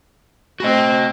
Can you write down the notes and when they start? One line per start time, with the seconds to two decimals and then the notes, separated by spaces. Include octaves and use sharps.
0.60 A3 C4 F#4 D#5